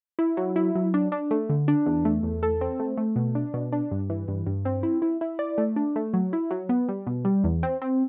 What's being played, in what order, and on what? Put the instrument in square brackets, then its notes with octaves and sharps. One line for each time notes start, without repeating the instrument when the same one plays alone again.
[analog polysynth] E4
F#3
E4
F#3
D4
D4
A3
D3
D4
E2
A3
E2
A4
C4
A3
A3
B2
D4
B2
D4
G2
E3
G2
G2
C4
E4
E4
E4
D5
A3
D4
A3
F#3
E4
F#3
B3
G3
B2
G3
E2
C4
C4